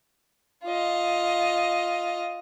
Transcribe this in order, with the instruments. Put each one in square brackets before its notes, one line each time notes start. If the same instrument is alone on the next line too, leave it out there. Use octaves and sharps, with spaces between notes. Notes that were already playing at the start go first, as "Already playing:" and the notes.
[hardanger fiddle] F4 D#5